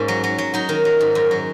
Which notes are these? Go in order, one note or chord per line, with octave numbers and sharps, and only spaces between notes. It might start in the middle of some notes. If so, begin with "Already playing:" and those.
Already playing: G#2 A#3 C#4 D#4
F#3
F#3
F#3
F#3 D#4
D#3
F#3
G#2
F#2
F#3